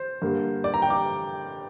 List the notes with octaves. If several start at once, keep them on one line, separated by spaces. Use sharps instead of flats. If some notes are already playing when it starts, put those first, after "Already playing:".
Already playing: C5
G2 D3 A#3
D5
A#5
G5
D6